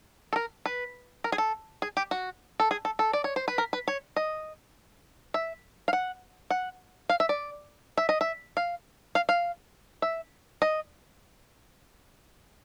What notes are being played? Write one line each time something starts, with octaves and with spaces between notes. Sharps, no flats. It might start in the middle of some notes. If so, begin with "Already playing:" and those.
A4
A#4
B4
A#4
G#4
A4
G#4
G4
F#4
A4
G#4
A4
A4
D5
C#5
C5
B4
A#4
B4
C#5
D#5
E5
F5
F#5
F#5
F5
E5
D5
E5
D#5
E5
F5
F5
F5
E5
D#5